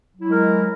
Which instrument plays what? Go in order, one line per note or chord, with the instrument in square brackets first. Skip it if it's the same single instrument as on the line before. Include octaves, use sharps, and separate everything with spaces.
[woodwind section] F#3
E4
G#3
A#4